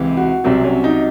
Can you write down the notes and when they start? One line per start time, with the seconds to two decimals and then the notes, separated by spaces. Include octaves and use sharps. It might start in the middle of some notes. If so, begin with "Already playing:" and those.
Already playing: C#2 C3 E3
0.17 F#4
0.44 C2 C3 F#3 C4
0.64 C#4
0.84 D#4